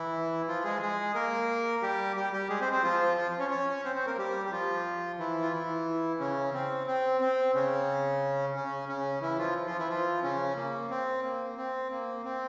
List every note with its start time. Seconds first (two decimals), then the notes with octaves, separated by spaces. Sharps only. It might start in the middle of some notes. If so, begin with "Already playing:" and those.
Already playing: E3 E4
0.48 F3 F4
0.65 G#3 G#4
0.81 G#3 G#4
1.15 A#3 A#4
1.82 G3 G4
2.16 G3 G4
2.33 G3 G4
2.49 G#3 G#4
2.61 C4 C5
2.72 C4 C5
2.83 F3 F4
3.17 F3 F4
3.39 C#4 C#5
3.50 C#4 C#5
3.84 C4 C5
3.96 C4 C5
4.06 A#3 A#4
4.18 G3 G4
4.46 G4
4.52 F3 F4
5.19 E3 E4
5.41 F4
5.52 E3 E4
6.19 C#3 C#4
6.54 C4
6.87 C4
7.21 C4
7.55 C#3 C#4
8.55 C#3 C#4
8.88 C#3 C#4
9.22 E3 E4
9.39 F3 F4
9.67 F3 F4
9.78 E3 E4
9.89 F3 F4
10.23 C#3 C#4
10.56 A#3
10.90 C4
11.24 A#3
11.57 C4
11.91 A#3
12.24 C4